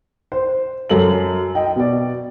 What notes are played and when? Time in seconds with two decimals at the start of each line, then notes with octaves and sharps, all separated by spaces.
0.32 C5
0.90 F#2 A4 F#7
1.55 D#5 G5
1.76 B2 D5